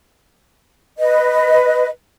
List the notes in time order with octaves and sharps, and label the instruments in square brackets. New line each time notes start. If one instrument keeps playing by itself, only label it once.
[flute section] B4 D#5